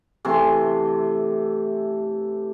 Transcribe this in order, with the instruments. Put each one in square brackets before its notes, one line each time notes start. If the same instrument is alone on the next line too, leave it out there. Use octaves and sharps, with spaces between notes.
[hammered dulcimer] C3 E3 A3 C6